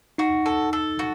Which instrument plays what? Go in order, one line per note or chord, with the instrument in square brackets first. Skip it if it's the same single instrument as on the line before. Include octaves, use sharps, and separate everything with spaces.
[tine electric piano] D#4 [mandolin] F#4
[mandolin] A4
A4
F#4